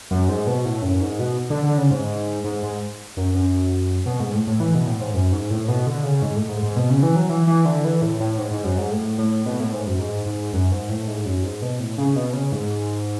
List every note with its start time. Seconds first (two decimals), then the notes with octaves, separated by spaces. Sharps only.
0.11 F#2
0.28 G#2
0.47 B2
0.65 A2
0.82 F#2
1.01 G#2
1.19 B2
1.50 D3
1.63 D3
1.78 C#3
1.91 G#2
2.44 G#2
2.63 G#2
3.17 F#2
3.35 F#2
4.06 B2
4.20 G#2
4.33 A2
4.47 A2
4.60 E3
4.74 B2
4.87 A2
5.00 G#2
5.14 F#2
5.32 G#2
5.50 A2
5.68 B2
5.87 D3
6.03 C#3
6.22 G#2
6.36 A2
6.49 G#2
6.63 G#2
6.76 B2
6.90 C#3
7.03 E3
7.16 F#3
7.29 E3
7.47 E3
7.65 D3
7.84 E3
8.02 A2
8.20 A2
8.38 G#2
8.51 G#2
8.64 F#2
8.78 G#2
8.91 A2
9.18 A2
9.46 B2
9.60 A2
9.73 G#2
9.87 F#2
9.99 G#2
10.26 G#2
10.53 F#2
10.71 G#2
10.89 A2
11.08 G#2
11.25 F#2
11.44 G#2
11.62 B2
11.79 A2
11.98 C#3
12.16 B2
12.33 C#3
12.52 G#2